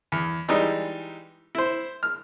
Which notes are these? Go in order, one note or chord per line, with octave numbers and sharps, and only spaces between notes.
E2
E3 G3 G#3 D#4
E4 C5
F6